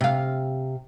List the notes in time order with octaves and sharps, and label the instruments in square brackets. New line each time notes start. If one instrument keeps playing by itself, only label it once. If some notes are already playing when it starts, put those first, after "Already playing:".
[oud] C3 F5